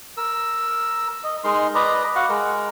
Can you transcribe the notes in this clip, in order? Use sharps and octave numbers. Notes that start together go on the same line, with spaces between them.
A#4 E6
D#5
G#3 D#4 A#4 C6
B4 D5 D#5 A#5
F#4 F5 F#5
G#3 A#4